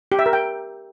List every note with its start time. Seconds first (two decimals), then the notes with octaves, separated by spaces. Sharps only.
0.12 G4
0.19 E5
0.26 A#4
0.33 G5